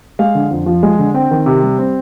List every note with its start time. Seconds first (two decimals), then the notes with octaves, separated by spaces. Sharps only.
0.19 G#3 F5
0.35 D3
0.50 F2
0.66 F3
0.83 G#3
0.99 D3
1.14 C4 G5
1.31 D#3
1.46 C3
1.62 G3
1.79 C4